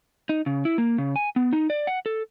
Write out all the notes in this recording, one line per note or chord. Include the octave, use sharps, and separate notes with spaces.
D#4
C#3
E4
A#3
C#3
G#5
B3
D#4
D5
F#5
A4